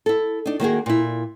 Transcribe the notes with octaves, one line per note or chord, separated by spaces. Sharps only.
E4 A4
D4 D#4
D#3 A#3 F#4 G#4
A#2 E4